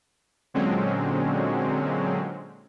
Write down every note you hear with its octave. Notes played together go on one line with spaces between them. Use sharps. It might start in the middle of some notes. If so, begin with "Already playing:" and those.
A#2 D3 F#3 G#3 C4 C#4